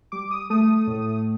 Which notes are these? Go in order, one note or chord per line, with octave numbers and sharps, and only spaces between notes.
G3 D6
D#6
A3 D#6
A2